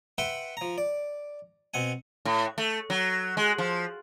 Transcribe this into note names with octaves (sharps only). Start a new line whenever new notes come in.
B4 E5 F#5 G5 B5 C6
F3 A#5
D5
B2 C4 F#5 G#5
A2
A3
F#3
G#3
F3